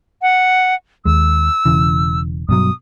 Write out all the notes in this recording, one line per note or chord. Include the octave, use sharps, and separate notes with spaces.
F#5
D#2 G#3 E6
E1 C#3 E3
G2 B2 F#3 D#6